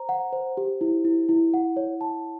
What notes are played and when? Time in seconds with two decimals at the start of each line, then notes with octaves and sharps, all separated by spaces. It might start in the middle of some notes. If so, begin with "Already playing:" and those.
Already playing: C5 A#5
0.09 F#5
0.33 C5
0.57 G4
0.81 E4
1.05 E4
1.29 E4
1.54 F#5
1.77 C#5
2.01 A5